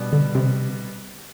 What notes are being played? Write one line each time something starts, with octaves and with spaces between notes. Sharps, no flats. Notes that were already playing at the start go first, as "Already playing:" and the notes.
Already playing: B2 G3 B3 D4
D3
C3